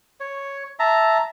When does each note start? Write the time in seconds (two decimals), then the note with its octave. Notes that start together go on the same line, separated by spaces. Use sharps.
0.20 C#5
0.79 E5 A5 A#5